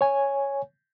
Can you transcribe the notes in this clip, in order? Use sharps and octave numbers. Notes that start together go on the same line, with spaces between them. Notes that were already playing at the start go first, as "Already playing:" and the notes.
C#5 G#5